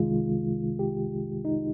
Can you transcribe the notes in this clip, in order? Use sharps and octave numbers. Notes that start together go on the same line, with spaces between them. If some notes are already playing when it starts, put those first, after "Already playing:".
Already playing: C2 C3 D#3 G#3 F4
G4
D#4